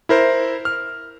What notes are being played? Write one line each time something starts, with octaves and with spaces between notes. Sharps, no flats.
E4 A#4 C5
F6